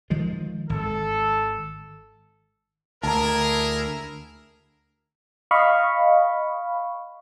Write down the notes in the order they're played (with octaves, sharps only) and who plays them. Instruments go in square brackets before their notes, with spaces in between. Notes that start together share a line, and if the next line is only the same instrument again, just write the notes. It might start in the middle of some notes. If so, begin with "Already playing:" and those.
[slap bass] D#3 F3 G#3
[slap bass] G#1 [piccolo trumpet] A4
[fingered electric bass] D2 [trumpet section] E4 G#4 A#4 [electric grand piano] A5 A#5
[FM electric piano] D#5 F5 B5 C#6